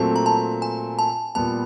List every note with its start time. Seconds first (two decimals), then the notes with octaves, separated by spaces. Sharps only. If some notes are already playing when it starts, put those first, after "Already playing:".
Already playing: A#2 F#3 A3 C4 A5
0.16 A#5
0.26 A5
0.62 G#5
0.99 A5
1.35 A#2 G3 B3 A5